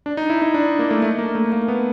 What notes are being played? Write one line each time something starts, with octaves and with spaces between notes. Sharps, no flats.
D4
D#4
E4
D#4
D4
A#3
A3
A3
A#3
A3
A#3
B3